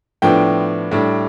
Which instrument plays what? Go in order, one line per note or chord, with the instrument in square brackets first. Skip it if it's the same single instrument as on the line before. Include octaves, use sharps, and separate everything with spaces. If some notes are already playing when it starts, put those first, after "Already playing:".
[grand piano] A2 F3 B3 D4 G5
A2 G3 D4